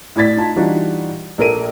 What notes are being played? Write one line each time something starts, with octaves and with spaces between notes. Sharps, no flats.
A2 E4 D5 G#6 A6 B6
D#4 F4 A5
E3 G3 D4 D#4 F4 F#4
A#1 A#3 A4 A#4 D7 D#7